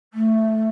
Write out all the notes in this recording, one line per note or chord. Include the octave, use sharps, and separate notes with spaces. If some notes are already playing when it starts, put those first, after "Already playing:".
A3